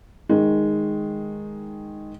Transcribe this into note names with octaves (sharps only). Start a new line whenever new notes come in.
D#3 G#3